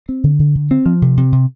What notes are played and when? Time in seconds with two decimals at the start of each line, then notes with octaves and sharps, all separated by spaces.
0.09 C4
0.24 D3
0.39 D3
0.55 D3
0.71 C4
0.86 F3
1.02 C3
1.17 C3
1.32 C3